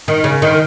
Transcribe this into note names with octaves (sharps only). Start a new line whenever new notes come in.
D#3
C#3
D#3